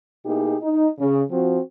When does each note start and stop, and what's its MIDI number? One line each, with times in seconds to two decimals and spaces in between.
0.25 0.56 47
0.25 0.56 58
0.25 0.56 63
0.25 0.56 64
0.25 0.56 67
0.25 0.56 68
0.62 0.87 63
0.99 1.21 49
1.30 1.59 53
1.30 1.59 60
1.30 1.59 66